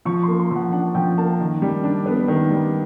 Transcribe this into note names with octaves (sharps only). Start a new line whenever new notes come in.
F3 C#6
A#3 C6
C6
F3 F#5
D4 F#5
F3 G5
A#3 A5
D#3
G3
D4
B3
D#3
G3